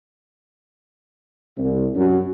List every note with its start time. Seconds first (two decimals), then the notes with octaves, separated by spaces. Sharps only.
1.58 C2
1.95 F#2